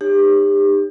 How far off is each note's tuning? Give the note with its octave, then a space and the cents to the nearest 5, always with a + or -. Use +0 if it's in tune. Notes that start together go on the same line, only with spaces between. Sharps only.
D#4 -35 G4 +30 C#5 +0